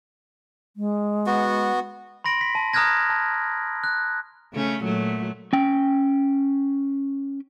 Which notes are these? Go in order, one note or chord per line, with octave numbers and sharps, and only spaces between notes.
G#3
B3 F#4
B5 C6 A#6 D7 F#7
B6
A5
A#5 D#6 F6 F#6 G#6 A#6
A5
F#6
C#3 A3 C#4
A#2 F#3 A3
C#4 G5